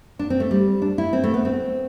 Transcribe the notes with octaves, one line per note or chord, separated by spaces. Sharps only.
D4
C4
A3
G3
D4
E4
C4
A3
B3
C4